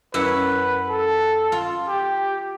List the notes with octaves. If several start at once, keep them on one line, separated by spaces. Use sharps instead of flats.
F#2 E4 B4 C#5
A4
F4
G4